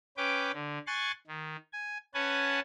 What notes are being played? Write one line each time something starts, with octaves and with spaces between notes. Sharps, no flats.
C#4 B4 G5 D6
D3
G#5 C6 C#6 F#6 A6
D#3
G#5
C#4 B4 F#5 G#5 A5